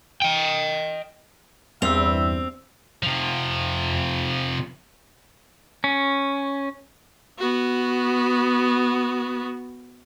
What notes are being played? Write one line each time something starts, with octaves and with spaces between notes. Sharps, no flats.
D#5 G5
E2 G2 G3 C4 E5 E6 F7
C3 F3
C#4
B3 F#4